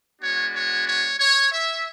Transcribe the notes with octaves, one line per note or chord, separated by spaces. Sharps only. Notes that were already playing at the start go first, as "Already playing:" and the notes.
G#3 B3 D4 F#4 C#5
C#5
C#5
C#5
E5